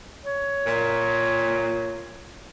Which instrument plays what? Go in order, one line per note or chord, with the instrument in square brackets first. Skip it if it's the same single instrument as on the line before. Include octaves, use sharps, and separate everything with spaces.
[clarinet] C#5
[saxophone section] A#2